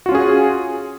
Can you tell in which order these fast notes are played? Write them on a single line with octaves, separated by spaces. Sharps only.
F#4 F4 C#4 G#4